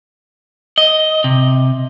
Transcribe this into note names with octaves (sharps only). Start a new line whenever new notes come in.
D#5
C3